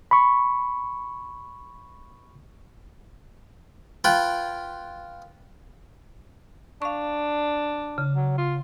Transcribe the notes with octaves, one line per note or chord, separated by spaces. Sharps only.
B5 C#6
F4 B4 G5 B5
D4 F5 C#6
C#3
F#3
F4